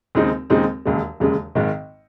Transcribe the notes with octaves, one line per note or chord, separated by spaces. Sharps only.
D#2 C#3 G#3 C4 D#4
D#2 C#3 G#3 C4 D#4
E1 D#2 C#3 G#3
E1 D#2 C#3 G#3
G#1 G#2 D#3